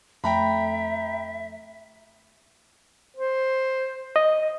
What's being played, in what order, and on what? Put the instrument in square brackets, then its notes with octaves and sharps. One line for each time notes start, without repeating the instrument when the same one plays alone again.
[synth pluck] F2 A3 [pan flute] E5 [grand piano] G5 A#5 B5
[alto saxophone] C5
[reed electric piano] D#5